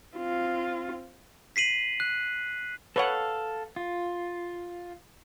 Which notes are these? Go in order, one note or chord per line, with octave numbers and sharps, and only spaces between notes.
C4 F4
B6 C7 D#7 F#7
F#6
A4 B4 C#5 F5 F#5
F4